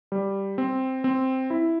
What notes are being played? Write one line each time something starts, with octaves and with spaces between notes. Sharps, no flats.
G3
C4
C4
E4